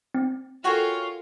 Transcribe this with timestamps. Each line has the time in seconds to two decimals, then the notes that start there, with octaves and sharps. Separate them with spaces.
0.14 C4
0.64 F4 F#4 A4 A#4 C#5 F5 G5 G#5